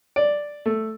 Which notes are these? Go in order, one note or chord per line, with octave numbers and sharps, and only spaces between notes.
D5
A3